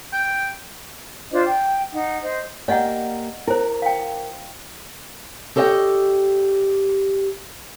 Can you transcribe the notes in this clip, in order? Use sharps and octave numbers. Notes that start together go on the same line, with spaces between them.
G5
D4 F4 C5 D#5
G5
D#4 F#5
C5 D#5
A#3 G4 D5 D#5 F#5 G5
E4 A#4 C5
F5 G5
G4 A4 C#5 D#5 F5 G5